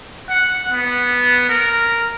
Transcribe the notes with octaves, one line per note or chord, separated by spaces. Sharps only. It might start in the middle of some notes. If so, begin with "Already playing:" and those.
F#5
B3
A#4